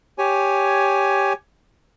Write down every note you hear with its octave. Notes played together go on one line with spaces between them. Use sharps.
G4 C#5 G#5